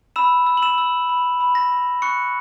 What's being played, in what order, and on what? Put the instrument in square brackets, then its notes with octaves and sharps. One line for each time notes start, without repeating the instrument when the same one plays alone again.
[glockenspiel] B5 E6 E7
E6
F#7
E6 E7
E6
B5
B5
A#6
B5
C#6 F#6 C#7